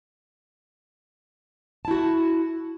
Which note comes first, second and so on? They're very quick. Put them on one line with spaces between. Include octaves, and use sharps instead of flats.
A5 E4 F#4